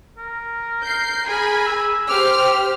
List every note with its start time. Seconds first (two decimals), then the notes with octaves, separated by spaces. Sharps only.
0.18 A#4
0.83 G6 C7
1.27 G#4 G#5 B5
1.66 E6
2.09 G4 C5 D6 F6